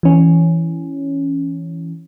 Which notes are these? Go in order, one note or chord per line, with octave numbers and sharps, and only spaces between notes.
E3 C#4